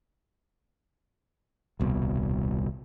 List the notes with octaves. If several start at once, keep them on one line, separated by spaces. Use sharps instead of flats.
D#1 C2 B2